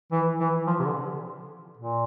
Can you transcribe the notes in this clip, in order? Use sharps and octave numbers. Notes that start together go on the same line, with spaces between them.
E3
E3
F3
C3
D3
A#2